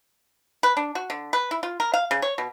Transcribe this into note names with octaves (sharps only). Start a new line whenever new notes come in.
B4
D4
F#4
D3
B4
E4
F4
A#4
F5
C#3
C#5
B2